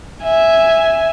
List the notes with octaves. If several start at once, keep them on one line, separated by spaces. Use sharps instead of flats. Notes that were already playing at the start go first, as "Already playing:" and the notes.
E5 G#5